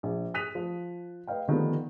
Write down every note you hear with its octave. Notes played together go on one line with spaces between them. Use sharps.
A#1
D#6 F#6 B6 D#7 F7
F3
B4 D#5 F5 G5
D3 D#3 F3 G3 B3